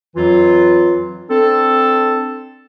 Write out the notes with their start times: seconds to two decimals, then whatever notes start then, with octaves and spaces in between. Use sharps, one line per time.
0.16 F2 E3 F#3 F4
1.29 C4 D4 A4